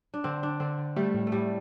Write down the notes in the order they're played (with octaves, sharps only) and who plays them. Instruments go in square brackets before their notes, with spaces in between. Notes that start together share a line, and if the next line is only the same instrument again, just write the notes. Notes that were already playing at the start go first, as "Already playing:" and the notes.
[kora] D4
[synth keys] D3 [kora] C4
[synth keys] D3 [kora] D4
[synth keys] D3 [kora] C4
[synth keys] D3
[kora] G3 [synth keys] A3
[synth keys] A2
[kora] A3
[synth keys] A2 [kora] G3